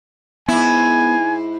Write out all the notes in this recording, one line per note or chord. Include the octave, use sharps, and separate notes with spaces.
G#2 B3 E4 G#5